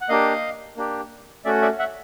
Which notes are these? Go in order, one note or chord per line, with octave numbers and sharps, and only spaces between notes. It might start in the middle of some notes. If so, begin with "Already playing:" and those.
F#5
A#3 D4 G4 D#5 F5
A#3 D4 G4
A3 C#4 F#4 D5 E5
D5 E5
E5 F#5